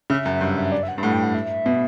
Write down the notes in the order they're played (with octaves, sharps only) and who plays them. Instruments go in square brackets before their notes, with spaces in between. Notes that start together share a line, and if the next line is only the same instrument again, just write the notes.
[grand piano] C#3 [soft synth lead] E5
[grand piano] F#2
G2
[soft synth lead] D5
E5
F#5
[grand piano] G2 [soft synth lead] E5
[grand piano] A2 [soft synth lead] F#5
[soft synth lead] G5
F#5
E5
[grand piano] B2